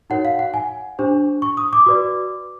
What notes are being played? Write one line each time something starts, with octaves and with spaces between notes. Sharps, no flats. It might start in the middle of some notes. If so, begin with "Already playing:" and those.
D#4 F#4 A#4 C#5 F#5
F5
F#5
G#5
D4 G4 C5
C#6
D#6
D6
F#4 B4 D5